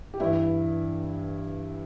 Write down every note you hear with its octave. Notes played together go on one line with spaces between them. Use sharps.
G4
G2 E3 E4